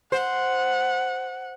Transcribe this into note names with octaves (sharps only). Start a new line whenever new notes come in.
C5 F#5